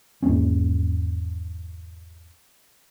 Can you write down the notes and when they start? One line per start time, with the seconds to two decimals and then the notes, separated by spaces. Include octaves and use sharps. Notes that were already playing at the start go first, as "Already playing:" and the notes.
0.22 G#1 E2 A#3 C#4